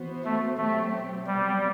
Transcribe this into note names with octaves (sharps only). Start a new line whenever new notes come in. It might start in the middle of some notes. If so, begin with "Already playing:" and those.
Already playing: E3 B3 F#4 C5
A3
B2 F#3 A3 C4 G4
C3 F#3 G3 B3